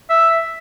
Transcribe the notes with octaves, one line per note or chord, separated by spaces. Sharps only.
E5